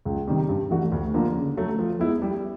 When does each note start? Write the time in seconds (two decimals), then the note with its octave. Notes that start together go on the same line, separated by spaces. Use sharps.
0.05 C#2
0.27 C3 D#3 G3
0.49 G2
0.71 E3 A3 D4 F#4
0.92 D2
1.14 D3 F3 A#3 D4
1.35 C#3
1.57 F#3 A3
1.79 F3
2.00 G#3 B3 E4
2.22 G3